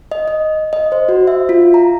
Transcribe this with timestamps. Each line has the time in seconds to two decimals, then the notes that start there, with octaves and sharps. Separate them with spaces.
0.12 D#5
0.28 D#5
0.73 D#5
0.92 C5
1.09 F#4
1.27 E5
1.49 F4
1.74 A#5